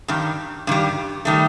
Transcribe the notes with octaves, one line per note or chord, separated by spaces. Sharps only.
G2 D#3 G3
G2 D#3 G3
D#3 G3 A3